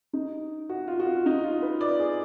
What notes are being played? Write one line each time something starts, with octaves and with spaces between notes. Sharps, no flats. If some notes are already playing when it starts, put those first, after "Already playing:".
D#4
F#4
F4
F#4
F4
D#4
F4
B4
D5
G#4